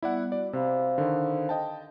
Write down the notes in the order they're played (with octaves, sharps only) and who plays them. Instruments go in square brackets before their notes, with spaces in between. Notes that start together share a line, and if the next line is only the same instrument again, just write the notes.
[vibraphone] G3 B3 [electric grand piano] E4 D5 F#5
[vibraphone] F#4 [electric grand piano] D5
[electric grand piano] C3 [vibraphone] C5 F5 B5
[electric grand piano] D3 D#3
D#5 G5 A5